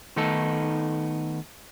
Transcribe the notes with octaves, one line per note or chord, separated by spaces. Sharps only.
D#3 A3 B3 D#4 A4